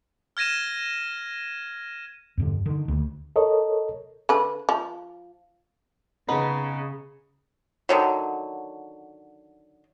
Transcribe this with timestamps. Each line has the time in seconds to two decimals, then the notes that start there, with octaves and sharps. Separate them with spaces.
0.37 F6 G#6 A#6 D#7 E7
2.37 E2 G2 D3
2.66 D3 D#3
2.88 D2
3.36 A4 A#4 C#5 D#5
4.29 D3 B4
4.69 F3
6.28 C#3 B3 D#4 B4
7.89 D3 D#3 F#3